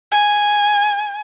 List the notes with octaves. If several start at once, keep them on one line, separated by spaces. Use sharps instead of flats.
G#5